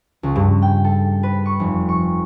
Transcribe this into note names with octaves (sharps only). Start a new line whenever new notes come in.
C#2
G2
G5
A4
B4
C#6
F1
C#6